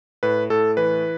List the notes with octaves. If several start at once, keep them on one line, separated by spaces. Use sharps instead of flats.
A2 B4
A2 A4
E3 B4